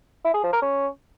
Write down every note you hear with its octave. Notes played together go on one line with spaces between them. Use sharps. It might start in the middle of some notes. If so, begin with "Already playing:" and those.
E4
G#4
F3
A#4
C#4